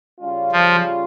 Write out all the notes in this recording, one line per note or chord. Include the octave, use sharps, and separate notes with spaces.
C#3 G3 C#4 F4
F3